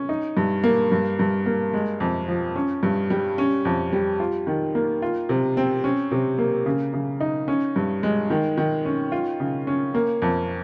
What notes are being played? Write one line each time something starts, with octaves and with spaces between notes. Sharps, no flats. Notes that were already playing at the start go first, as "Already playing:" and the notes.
Already playing: C#4
D#4
G2
A#3
G2
G2
A#3
G#3
F2
F3
C#4
G2
G3
C#4
F2
G3
F4
D#3
A#3
F4
C3
C4
C#4
C3
A#3
C#3
C#3
D#4
C#4
G2
G#3
D#3
D#3
C#4
F4
C#3
C#4
A#3
F2